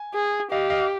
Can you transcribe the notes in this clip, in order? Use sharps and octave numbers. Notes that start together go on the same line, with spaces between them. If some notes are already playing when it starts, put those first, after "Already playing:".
Already playing: G#5
G#4
G4 D#5 F5
D#5 F5